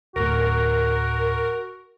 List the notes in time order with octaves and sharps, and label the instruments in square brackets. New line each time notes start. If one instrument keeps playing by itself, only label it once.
[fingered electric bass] D1 A2 [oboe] F#4 [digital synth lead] A#4